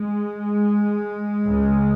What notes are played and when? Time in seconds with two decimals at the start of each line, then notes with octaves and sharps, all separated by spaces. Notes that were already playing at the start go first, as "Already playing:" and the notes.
Already playing: G#3
1.44 C#2 C#3